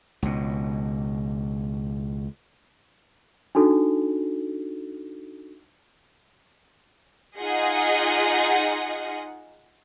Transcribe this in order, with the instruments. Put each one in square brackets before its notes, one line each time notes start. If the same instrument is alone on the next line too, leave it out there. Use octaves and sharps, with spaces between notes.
[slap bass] C#2 B2
[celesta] D4 D#4 F#4 A4
[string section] D#4 F4 G#4 D#5 F#5